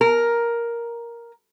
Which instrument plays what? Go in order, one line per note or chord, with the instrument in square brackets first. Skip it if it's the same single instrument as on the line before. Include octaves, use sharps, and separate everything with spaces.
[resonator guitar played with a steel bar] A#4